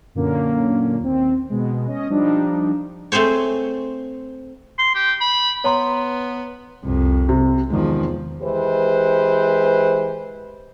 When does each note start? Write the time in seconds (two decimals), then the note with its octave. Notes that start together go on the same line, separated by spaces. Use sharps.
0.15 F#2 A#2 D3 A#3 C#4
0.99 D#2 C4
1.50 B2 G#3
1.87 C#4 D#5
2.09 F3 G3 D4 D#4
3.12 A3 C4 G#4 C5 C#5
4.79 C6
4.95 G4
5.21 B5
5.64 B3 C#5 A#5 C6
6.84 C2 F2
7.29 C3
7.70 E2 D#3 F3 G#3
8.42 E3 G#3 G4 B4 C5